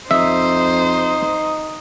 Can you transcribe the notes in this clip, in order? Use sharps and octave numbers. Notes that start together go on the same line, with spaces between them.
F2 D#4 C5 E5